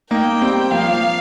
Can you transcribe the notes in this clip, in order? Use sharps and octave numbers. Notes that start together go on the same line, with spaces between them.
A#3 D#4 G5
G3 C4
F3 A#3 F5
F3